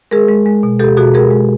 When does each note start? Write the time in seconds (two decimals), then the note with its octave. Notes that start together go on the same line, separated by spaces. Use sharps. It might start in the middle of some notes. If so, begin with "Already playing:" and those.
0.11 G#3 G#4 A#4
0.28 G#3
0.46 G#3
0.63 B2
0.79 B2 G4 A4
0.97 B2 F#4 G#4
1.14 G#3 G#4 A#4
1.31 G#3